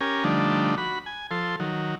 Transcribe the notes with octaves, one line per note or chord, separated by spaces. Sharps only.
C#4 G4 A#4 G#5
D3 F3 G3 A3 D4 D#4
F#4 B5
G#5
F3 A4 C6
D#3 F#3